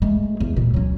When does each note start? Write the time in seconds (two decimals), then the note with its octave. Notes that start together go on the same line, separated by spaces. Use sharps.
0.02 G#3 A3
0.40 E2
0.56 A#2
0.74 F#3 C#4